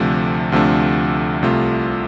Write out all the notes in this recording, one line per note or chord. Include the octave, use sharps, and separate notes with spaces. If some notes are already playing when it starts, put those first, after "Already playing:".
Already playing: D2 C3 F3 A3 D4
D2 C3 F3 A3 D4
C2 C3 A3 F4